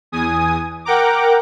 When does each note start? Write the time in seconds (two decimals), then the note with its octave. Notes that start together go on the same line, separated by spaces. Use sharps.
0.12 E2 G#5 D#6
0.85 A#4 F#5 G5 A#5 D6